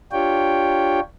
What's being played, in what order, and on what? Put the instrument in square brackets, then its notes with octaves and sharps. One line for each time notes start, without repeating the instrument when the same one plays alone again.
[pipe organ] D4 F4 G4 C#5 G5